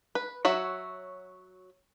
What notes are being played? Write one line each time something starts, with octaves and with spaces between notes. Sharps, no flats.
B4
F#3 F#4 C#5 E5